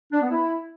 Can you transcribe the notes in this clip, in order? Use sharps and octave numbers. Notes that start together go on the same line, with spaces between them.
D4
B3
E4